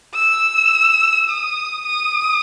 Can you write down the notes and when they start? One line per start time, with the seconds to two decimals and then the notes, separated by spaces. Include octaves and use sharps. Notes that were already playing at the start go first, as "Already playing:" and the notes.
0.15 E6
1.29 D#6
1.85 D#6